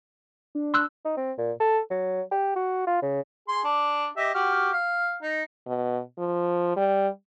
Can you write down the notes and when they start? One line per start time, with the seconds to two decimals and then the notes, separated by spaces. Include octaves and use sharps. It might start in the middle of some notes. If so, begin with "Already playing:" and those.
0.55 D4
0.74 C6 E6 F#6
1.05 D#4
1.17 C4
1.38 A#2
1.60 A4
1.90 F#3
2.31 G4
2.56 F#4
2.87 F4
3.02 C#3
3.48 G#4 C6
3.64 D4
4.17 G4 D#5 E5
4.34 F#4 G4 F6
4.72 F5
5.23 D#4
5.67 B2
6.18 F3
6.76 G3